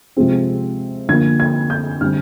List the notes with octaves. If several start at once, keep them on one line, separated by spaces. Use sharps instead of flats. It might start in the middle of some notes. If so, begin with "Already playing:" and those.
C3 F3 G#3 C4
D3 F3 A#3 G#6
G#6
G6
D3 G3 C4 F6